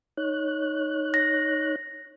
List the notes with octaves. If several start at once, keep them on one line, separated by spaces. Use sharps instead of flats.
D#4 C#5 F#6
A#6